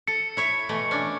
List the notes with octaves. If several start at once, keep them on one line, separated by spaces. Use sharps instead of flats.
A4 C#7
E4 C#5 E5
B2 E3 A3
C#4 D4